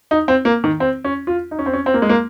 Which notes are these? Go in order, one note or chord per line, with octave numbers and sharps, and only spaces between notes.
D#4
C4
A#3
D#3
C4
C#4
F4
D#4
C#4
C4
C#4
C4
A#3
G#3
A#3